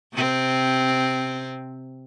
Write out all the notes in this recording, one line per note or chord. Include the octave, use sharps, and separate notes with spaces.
C3 C4